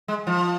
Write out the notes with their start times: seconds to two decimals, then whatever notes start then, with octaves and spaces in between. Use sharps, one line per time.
0.08 G#3
0.27 F3